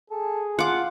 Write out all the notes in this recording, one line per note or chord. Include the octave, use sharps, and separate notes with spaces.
G#4 A4
F4 F#5 D6